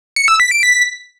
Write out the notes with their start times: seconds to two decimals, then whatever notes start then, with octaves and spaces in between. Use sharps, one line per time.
0.16 C#7
0.28 E6
0.40 B6
0.51 D7
0.63 B6